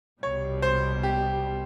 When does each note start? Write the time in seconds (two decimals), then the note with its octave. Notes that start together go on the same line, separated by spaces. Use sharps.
0.22 C2 B2 G3 C#5
0.62 C5
1.03 G4